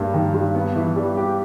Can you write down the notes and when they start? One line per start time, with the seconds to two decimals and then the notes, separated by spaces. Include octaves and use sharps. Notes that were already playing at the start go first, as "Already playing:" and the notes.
Already playing: G2 A#3
0.14 D#3
0.34 G2
0.55 B3
0.76 E3
0.96 G3
1.17 G4